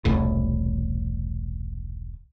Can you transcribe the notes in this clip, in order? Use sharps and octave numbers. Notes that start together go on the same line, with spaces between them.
E1 C2 A2